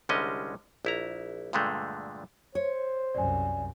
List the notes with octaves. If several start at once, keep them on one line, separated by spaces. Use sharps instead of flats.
C2 D3 G3 G#3 C#4 D#5
A#1 E4 A#5
G2 A#2 D3 G#3 A3
C5 C#5
C2 F#2 D5 G#5